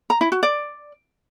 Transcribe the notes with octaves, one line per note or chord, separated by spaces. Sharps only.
A#5
E4
F#4
D5